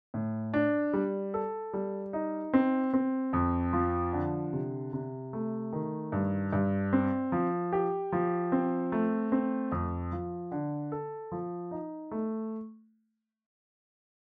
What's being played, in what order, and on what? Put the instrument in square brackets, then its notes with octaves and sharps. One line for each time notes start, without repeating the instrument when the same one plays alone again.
[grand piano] A2
D4
G3
A4
G3
D#4
C4
C4
F2
F3
D3
C3
C3
A3
D#3
G2
G2
C4
F3
G4
F3
C4
A3
C4
F2
F3
D3
A4
F3
D#4
A3